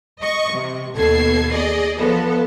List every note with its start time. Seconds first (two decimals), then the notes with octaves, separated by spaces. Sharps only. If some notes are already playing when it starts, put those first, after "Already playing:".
0.20 D#5 C#6
0.54 C3
0.96 D#2 B2 A4 G#6 C7
1.52 G#4 D5 D#5
1.97 F3 B3 A4